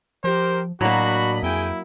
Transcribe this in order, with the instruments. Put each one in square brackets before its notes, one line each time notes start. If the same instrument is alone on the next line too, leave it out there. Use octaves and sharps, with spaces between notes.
[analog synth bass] F3 [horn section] G4 A#4 [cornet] C5
[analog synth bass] A2 [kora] F#3 A#3 [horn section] D4 D#5 B5 [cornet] F#4
[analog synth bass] F2 [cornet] E4 [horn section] G#4 G5 G#5